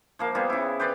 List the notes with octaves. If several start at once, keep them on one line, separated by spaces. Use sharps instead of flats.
F3 A#3 F5
G3 B3 F4 G#4
C#3 E4
G4 B4 C5 D5